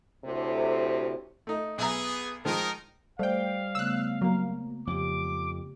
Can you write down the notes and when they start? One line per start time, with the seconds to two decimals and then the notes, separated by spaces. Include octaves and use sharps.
0.24 D2 A2 C3
1.47 A3 D#4
1.78 B1 B3 G#4 E5 A#5
2.45 D#3 F3 G#3 D#4 A#4
3.19 G3 A3 C5 D5 F5 G5
3.75 C#3 A3 B3 E6 F#6
4.21 F#3 A#3 A#5
4.87 F2 C#3 G4 D6